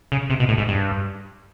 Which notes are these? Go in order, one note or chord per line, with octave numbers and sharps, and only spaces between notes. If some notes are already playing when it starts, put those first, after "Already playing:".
C#3
C3
B2
A2
G#2
G2